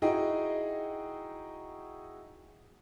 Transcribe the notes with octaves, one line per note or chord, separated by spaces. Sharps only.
D#4 E4 F#4 G#4 D#5 G5